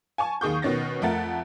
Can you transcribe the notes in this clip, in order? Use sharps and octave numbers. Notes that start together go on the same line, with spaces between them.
G#5 A5 C#6
D#2 D#3 G#4 C#6 G6
B2 D#3 C#4 A6 A#6
F2 A3 A#4 F#5 A6